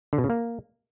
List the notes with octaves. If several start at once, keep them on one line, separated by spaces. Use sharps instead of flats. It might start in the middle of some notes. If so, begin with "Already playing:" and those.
D3
B2
C#3
A#3